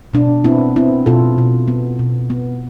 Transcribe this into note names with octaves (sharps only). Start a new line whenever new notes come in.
B2 D4
B3 C4 E4
B3 C4 E4
B2 F4 A4
B2
B3
B2
B3